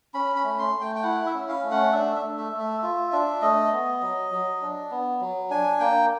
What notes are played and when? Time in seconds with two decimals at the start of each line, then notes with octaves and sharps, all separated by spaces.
0.14 C#4 B5
0.36 B5
0.44 A3
0.59 C6
0.73 A3
0.81 G5
0.96 G5
1.03 E4 F#5
1.26 E5
1.34 C#4
1.48 F5
1.63 A3
1.71 F#5
1.92 D4 E5
2.16 E5
2.22 A3
2.38 E5
2.52 A3
2.60 E5
2.83 F4 E5
3.12 D4 E5
3.42 A3 D#5
3.72 B3
4.01 F#3
4.31 F#3
4.61 D4
4.91 B3
5.21 F#3
5.50 D4 G#5
5.80 A#3 G5